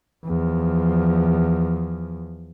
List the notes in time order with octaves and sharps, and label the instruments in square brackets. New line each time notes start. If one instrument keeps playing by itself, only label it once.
[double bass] E2 F3